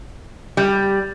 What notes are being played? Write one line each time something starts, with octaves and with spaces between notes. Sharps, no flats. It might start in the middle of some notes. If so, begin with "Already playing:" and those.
G3